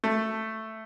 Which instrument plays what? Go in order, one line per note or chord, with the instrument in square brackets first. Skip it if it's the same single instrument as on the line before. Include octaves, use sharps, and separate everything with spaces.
[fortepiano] A3